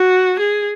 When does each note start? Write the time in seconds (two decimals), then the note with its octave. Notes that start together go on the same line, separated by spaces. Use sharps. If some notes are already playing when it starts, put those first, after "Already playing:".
Already playing: F#4
0.40 G#4